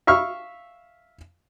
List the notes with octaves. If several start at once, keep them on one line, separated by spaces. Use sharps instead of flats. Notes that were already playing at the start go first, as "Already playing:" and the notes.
E5 F5 C#6 F6